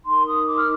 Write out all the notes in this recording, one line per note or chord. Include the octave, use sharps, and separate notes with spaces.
D#4 A#4 C6
D#6
D6
F6